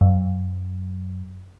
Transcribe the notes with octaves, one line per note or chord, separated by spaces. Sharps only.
F#2